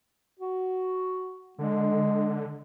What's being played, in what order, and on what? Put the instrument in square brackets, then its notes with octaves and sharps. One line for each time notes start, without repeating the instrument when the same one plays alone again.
[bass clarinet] F#4
[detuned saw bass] D3 [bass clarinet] G#3